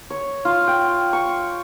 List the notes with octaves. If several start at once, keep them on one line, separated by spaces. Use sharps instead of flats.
C#5
F4
G5
C#6